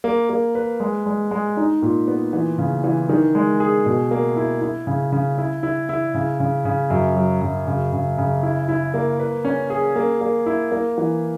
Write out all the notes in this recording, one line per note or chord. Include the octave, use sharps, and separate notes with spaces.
A#3
A#3
B4
G#3
G#3
G#3
D#4
A#2
B3
E3
C#3
E3
D#3
G#3
G#4
B2
A#3
E4
E4
C#3
C#3
E4
E4
E4
C#3
C#3
C#3
F#2
F#3
F#2
C#3
C#3
C#3
E4
E4
A#3
B4
C#4
G#4
A#3
A#3
E4
A#3
E3